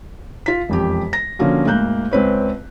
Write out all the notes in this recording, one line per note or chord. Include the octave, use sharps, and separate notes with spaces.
F4 B6
E1 F2 G4
A#6
D3 F3 A#3 C#4 F#4
D2 G#2 A#3 F#6 G6
C#2 C4 B4 C#5